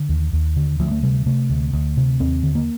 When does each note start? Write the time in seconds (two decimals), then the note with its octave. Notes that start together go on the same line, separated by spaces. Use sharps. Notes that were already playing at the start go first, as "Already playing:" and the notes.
Already playing: D3
0.09 D#2
0.33 D#2
0.56 D3
0.79 D2 F3
0.91 A3
1.03 C3 G3
1.26 C3 A3
1.50 D2
1.73 D2
1.97 C3
2.20 D#2 C4
2.43 D3
2.55 A#3